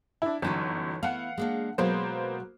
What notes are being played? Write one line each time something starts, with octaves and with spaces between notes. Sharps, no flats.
D4 E4
G1 F#2 E3 D#4 A4
A3 B3 E4 F5 F#5
G#3 A#3 D4
B2 F#3 G#3 A#3 B3 C5